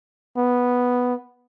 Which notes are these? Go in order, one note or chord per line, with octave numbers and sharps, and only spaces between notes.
B3